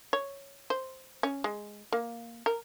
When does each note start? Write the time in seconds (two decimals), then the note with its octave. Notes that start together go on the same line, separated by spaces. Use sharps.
0.13 C#5
0.70 C5
1.23 C#4
1.44 G#3
1.92 A#3
2.46 A#4